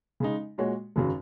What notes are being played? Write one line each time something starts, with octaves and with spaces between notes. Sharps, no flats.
C#3 G#3 D#4
A#2 G#3 F#4 C#5
G#1 F#2 C#3 F#3